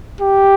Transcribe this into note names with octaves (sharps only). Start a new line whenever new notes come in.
G4